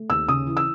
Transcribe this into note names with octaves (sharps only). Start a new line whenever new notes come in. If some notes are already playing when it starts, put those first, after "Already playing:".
Already playing: A3
D#2 E6
C#3 D#6
E3
E6